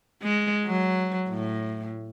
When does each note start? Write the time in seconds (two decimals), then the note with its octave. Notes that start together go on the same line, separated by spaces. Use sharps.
0.23 G#3
0.66 F#3
1.29 A2